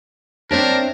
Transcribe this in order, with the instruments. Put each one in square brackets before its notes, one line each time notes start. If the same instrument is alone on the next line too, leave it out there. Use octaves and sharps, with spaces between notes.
[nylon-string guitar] C4 C#5 E5 [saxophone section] D4 [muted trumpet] A#4